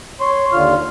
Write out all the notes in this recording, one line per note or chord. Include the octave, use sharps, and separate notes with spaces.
C#5 C6
D#2 D3 F4 F6